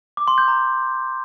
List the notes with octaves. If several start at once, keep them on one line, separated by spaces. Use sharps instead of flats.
D6
C6
G6
A#5